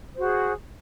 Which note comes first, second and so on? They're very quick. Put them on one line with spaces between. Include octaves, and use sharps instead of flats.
C5 F#4 G#4